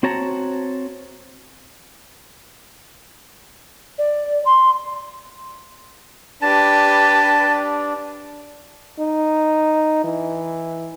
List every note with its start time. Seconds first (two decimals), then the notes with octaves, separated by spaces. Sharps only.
0.03 C4 F#4 C#5 A5 A#5
3.98 D5
4.46 C6
6.42 D4 G4 B4 A5
8.99 D#4
10.04 E3